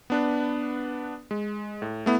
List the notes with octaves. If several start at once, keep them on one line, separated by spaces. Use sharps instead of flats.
B3 D4 B4
G#3
A2
A3 B3 E4